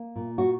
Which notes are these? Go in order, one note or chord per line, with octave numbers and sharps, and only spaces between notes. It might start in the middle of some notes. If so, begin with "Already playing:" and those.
Already playing: A#3
A#2
F#4